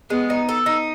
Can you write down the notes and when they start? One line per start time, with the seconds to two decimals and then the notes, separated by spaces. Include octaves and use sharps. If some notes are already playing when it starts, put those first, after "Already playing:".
0.10 G#3 B3
0.30 D#4
0.49 A4
0.66 D#4